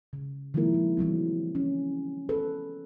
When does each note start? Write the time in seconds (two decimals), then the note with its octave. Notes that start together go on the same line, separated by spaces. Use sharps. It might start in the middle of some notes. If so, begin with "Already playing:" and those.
0.13 C#3
0.54 D#3 F3 G#3 A#3 E4 A#4
0.74 G#3
0.97 E3 F#3 G3 C4
1.55 C#4
2.29 A4 B4